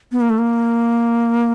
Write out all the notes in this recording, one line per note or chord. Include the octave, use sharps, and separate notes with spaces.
B3
A#3
A3
A#3